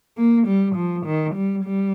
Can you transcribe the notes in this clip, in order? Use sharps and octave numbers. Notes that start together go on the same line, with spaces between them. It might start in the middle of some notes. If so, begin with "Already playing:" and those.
A#3
G3
F3
D#3
G3
G3